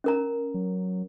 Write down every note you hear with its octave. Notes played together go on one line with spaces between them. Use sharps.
C#4 A#4 A#5
F#3